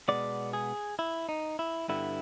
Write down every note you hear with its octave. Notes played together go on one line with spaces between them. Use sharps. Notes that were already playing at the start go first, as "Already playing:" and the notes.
B2 G#3 B3 D5
G#4
E4
D#4
E4
G2 D3 G3 B3 E4